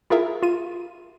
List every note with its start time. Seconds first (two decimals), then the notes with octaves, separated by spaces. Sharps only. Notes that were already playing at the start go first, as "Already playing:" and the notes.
0.10 E4 F4 G#4 A#4 E5
0.43 F4 D#7